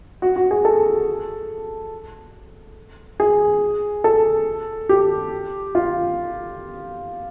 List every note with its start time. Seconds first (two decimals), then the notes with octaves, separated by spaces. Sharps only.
0.22 F#4
0.36 F#4
0.51 G#4
0.65 A4
3.20 G#4
4.04 A4
4.89 G4
5.75 F4